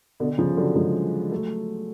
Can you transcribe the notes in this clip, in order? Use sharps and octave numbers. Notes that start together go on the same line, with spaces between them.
B2 D3
C#3 F3
D3 F#3
F3 G#3
F#3 A3